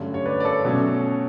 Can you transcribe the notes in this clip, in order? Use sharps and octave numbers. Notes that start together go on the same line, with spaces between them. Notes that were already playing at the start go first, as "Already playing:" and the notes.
Already playing: G2 D3 F#3 A3 C#4
C#5
B4 D5
D5
A4 C#5
B2 F#3 A3 C#4